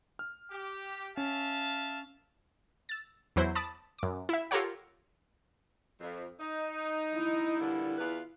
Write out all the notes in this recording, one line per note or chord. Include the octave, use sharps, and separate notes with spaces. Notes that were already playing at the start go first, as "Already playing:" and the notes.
F6
G4
C#4 E5 F5 A5
E6 A6
E2 F#3 E4 C5
A5 B5 D6 D#6 A6
F#2 D6
E4 E5
F4 G4 A4 A#4 C#5 F#5
F2
D#4
E4
G2 A#2 D3
E2 F4 B4